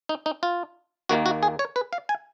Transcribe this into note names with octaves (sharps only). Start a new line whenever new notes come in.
D#4
D#4
F4
D#2 D#3 A#3 F#4
F#4
G#4
C#5
B4
F5
G#5